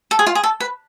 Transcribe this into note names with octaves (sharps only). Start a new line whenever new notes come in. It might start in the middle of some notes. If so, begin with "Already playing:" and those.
A4
G#4
F4
G#4
A4
B4